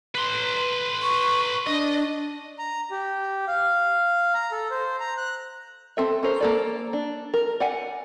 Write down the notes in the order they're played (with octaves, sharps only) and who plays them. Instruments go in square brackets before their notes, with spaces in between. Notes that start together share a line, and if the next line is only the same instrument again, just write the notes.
[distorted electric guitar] B4 C6
[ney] C#6
[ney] D4 [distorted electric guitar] D#5
[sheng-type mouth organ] A#5
G4
F5
A#5
A4
C5
A#5
F#6
[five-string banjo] C4 A4 E5
C#4 A4 A#4 C5
A#3 A4 D5
D4
A#4
D5 F#5 G#5